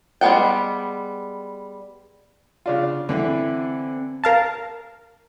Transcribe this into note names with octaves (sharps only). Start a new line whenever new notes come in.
G3 G#3 B3 F#5 G5
C#3 D4 F4
D3 E3 C4 E5
A#4 F5 A5